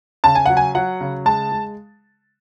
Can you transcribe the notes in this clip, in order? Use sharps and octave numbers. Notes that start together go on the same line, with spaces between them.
C#3 A5
G#5
F#3 F#5
G#5
F#3 F#5
C#3
G#3 A5
G#3